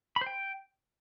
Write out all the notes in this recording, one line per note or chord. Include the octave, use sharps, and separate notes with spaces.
B5
C5
G5